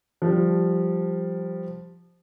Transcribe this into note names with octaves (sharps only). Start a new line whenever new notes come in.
F3 G3